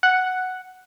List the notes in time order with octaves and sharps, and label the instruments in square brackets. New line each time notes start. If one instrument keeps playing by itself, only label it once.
[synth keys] F#5